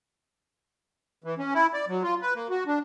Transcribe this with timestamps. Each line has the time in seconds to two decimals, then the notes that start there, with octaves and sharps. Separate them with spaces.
1.24 E3
1.38 C#4
1.54 E4
1.74 D5
1.88 F#3
2.03 F4
2.22 B4
2.35 A#3
2.50 F#4
2.66 D4